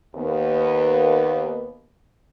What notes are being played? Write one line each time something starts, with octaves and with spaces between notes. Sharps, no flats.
D#2 B3